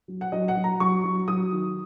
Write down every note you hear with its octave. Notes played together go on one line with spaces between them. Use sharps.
F#3
F#5
F#3 D#5
F#5
F#3
A#5
F#3 C#6
F#3
F#3 D#6
D#3